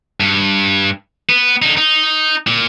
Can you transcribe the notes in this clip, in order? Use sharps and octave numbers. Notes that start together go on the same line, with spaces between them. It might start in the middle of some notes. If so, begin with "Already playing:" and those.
G2
B3
D3 D#4
D#4
A#2